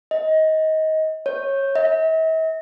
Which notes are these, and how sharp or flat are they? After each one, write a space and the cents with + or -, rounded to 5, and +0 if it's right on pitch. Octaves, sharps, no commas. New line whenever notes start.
D#5 +20
C#5 -20
E5 -45